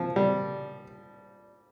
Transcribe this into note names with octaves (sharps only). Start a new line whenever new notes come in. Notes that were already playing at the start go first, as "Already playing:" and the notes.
Already playing: F3
G3